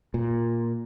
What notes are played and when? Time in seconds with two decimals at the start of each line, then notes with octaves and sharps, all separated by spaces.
0.14 A#2